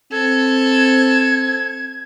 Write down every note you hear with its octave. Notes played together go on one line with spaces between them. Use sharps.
C4 A4 G#6